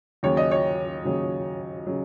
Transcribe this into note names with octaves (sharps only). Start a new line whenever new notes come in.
D#2 C#3 F#3 C#5
D#5
C#5
D#2 C#3 F#3
C#3 F#3